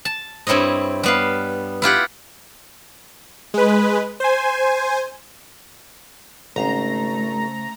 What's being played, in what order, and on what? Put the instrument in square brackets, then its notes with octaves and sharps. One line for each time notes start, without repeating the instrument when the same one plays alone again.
[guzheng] A5
G2 C4 E4 C#5 D#5
G3 B3 F5
E4 F4 G4 F#5
[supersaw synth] G#3 B4
C5 G#5
[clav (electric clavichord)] G#1 [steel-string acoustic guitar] C#3 C5 [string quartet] A3 [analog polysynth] A#5